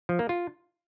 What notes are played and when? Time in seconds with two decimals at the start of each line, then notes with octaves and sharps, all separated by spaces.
0.09 F3
0.19 A#3
0.29 F4